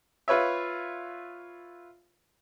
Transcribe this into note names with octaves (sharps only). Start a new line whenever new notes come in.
F4 B4 C#5 E5